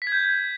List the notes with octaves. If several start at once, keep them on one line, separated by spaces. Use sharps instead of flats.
B6
G#6
G6